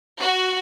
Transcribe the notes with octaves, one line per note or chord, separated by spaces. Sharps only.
F#4